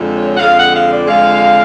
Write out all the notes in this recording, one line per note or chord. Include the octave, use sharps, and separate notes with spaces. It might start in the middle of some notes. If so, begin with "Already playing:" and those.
Already playing: F2 D3 G#3
C#5
F#5
F2 D3 G#3 F5
F#5
F5
D5
F2 D3 G#3 F5